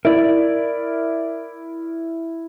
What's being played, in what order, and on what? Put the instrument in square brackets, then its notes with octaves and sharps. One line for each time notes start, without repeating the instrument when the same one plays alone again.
[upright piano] E4 [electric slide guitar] A#4 D5